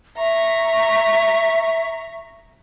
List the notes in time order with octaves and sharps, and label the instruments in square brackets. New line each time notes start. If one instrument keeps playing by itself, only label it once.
[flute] E5 [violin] A#5 C#6